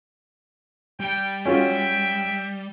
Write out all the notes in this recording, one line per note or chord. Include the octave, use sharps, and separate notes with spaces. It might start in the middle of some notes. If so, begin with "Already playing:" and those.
G3 G5
C#4 F4 F#4 E5 G5